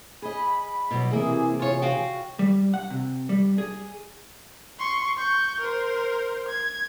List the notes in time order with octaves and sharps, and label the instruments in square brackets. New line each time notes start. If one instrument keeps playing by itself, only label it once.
[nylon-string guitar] G#4 D#5 [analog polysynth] B5
[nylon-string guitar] B2 F#3 G3
[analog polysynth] C3 E3 G#4 [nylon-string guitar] A#3 E4
[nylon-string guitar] F4 C#5
F#4 F5 G5
[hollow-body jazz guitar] G3
F#5
C3
G3
G#4
[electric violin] C6 C#6
C#6 G6
A#4 C5
G#6